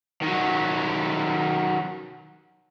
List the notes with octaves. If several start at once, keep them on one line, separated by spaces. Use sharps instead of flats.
D#3 F#3